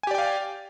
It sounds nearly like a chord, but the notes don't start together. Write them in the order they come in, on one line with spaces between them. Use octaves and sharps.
G#5 G4 D5 G5 F5